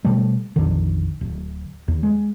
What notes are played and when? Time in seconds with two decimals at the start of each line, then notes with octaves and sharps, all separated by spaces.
0.05 B2 G3 A3
0.56 A#1 F2 D3 D#3
1.21 D1
1.88 D#2
2.03 G#3